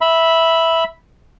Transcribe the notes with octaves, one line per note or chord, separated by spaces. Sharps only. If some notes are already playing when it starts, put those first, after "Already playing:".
E5 B5